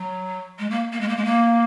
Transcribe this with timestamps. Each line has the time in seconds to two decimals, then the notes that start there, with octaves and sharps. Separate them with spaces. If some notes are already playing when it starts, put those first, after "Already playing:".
Already playing: F#3
0.59 G#3
0.70 A#3
0.92 A#3
1.01 G#3
1.09 A#3
1.17 G#3
1.25 A#3